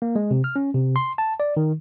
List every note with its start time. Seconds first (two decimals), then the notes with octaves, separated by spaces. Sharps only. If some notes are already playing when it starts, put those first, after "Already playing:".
0.02 A#3
0.16 G#3
0.31 C3
0.44 F6
0.56 C#4
0.74 C3
0.96 C6
1.18 A5
1.40 D5
1.57 D#3